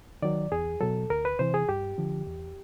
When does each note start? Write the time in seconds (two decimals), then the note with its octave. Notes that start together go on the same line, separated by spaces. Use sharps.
0.22 D#3 F#3 D5
0.52 E2 G#4
0.81 B2 F#3 A4
1.10 D2 A#4
1.25 B4
1.39 C3 E3 C5
1.54 G#4
1.69 G2 G4
1.98 D3 F3
2.27 E2